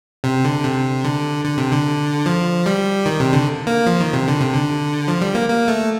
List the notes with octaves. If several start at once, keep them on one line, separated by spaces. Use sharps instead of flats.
C3
D3
C3
D3
D3
C3
D3
F3
G3
D#3
C3
D3
A#3
F3
D#3
C3
D3
C3
D3
F3
G3
A#3
A#3
A3